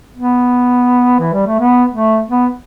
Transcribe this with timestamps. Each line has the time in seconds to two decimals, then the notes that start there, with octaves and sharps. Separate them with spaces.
0.17 B3
1.20 E3
1.33 G3
1.46 A3
1.59 B3
1.93 A3
2.29 B3